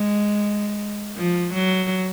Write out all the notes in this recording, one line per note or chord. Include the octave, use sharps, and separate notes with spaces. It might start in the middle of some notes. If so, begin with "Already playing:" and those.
Already playing: G#3
F3
F#3